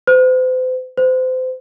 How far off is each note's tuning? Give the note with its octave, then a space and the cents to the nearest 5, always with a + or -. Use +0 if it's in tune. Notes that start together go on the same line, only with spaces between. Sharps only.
C5 -40
C5 -30